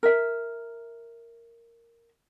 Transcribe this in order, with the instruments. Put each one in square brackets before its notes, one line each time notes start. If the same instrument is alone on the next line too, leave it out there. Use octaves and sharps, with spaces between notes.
[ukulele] A#4 E5